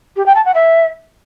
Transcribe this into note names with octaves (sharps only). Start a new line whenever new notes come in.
G4
G5
A5
F#5
E5